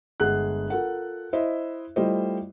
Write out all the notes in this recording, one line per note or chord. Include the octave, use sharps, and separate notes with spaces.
G1 G#3 G#4 F#5 F#6
F4 A4 A#4 F#5
E4 C5 D#5 E5
G3 A3 E4 F4 C5 D#5